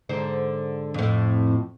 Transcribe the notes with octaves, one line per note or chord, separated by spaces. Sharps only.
G#2 D3 C5
F2 A2